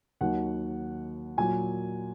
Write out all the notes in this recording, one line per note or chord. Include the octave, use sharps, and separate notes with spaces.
D#2 D#3 F#3 F#5
A#2 F#3 G#5